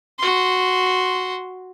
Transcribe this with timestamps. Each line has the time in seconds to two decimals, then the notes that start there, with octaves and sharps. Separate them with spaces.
0.19 F#4 C6